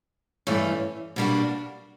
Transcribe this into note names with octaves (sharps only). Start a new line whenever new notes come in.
G2 E3 A3 C#4
B2 G3 A#3 D4 F#4